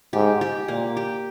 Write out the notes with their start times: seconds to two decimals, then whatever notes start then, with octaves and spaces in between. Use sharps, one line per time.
0.13 G#2 G4
0.41 G4
0.68 A#2 A#3
0.97 G4